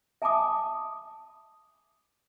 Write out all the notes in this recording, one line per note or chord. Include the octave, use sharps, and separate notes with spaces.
E5 G#5 A5 B5 D6 D#6